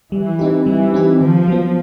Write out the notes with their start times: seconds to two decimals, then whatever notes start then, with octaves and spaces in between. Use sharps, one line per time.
0.12 E3 G3
0.39 C4 D#4 G4
0.66 E3 G3
0.94 C4 D#4 G4
1.20 D#3 F3
1.48 F#3 B3